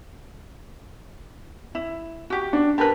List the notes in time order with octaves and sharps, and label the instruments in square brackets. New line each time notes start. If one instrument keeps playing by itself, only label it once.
[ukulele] E4
F#4 G4
[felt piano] D4
[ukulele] G4 A#4 B4 [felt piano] A5 F#6